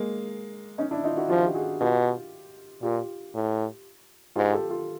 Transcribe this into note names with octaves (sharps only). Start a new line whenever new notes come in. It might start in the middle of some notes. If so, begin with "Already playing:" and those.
Already playing: G#3 A#3
C#4 D#4
D4 E4
D#4 F4
E4 F#4
F3 F4 G4
G4
F#4 G#4
B2 F4 G4
A#2 F4 G4
A2
G#2 F4 G4
G4 A4
F4 G4